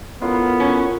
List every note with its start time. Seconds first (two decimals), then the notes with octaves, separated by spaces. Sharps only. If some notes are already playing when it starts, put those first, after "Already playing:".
0.22 B3 E4 F4 A4 A#4 C#5
0.60 C#4